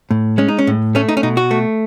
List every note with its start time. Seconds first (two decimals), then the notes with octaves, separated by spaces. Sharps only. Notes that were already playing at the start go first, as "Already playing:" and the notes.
0.11 A2
0.38 G#3 C#4
0.48 D#4
0.59 C#4
0.67 A2
0.95 A3 C#4
1.09 D#4
1.17 C#4
1.23 B2 D#4
1.37 F#4
1.51 A3